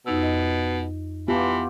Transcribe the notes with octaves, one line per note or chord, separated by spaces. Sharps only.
F2 B2 D#4 E6
D#5
E3 B3 F4 G4 A5